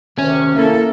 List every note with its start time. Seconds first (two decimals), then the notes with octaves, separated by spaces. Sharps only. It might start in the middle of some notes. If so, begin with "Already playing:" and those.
0.19 D2 C3 D#3 C#4
0.55 A3 A#3 E4 A4